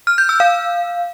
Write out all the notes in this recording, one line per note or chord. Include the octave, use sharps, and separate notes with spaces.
F6
G6
E6
F5